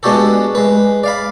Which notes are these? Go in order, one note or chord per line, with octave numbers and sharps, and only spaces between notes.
G#3 B3 D4 F#4 G4 A4
G#3 B4
D5 F5 B5